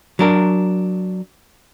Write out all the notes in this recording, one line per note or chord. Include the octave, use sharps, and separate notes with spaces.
F#3 D4 A#4